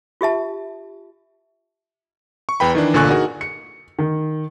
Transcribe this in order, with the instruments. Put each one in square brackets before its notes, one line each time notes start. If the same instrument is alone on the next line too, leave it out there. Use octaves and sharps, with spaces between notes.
[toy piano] F4 G4 E5 A5
[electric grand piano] C#6
E2 B4 G5 B5
D#3 E3 D4
G1 A#2 D3 G#5 C#6 F#6
D#4 F#4 G#4 A#4
[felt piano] C#7
D#3